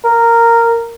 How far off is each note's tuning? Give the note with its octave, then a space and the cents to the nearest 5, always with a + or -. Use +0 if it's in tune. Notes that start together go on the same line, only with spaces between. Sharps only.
A#4 -10